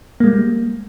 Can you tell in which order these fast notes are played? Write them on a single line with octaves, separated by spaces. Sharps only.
A#3 G#3 G3